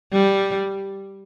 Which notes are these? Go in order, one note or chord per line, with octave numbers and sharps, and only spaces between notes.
G3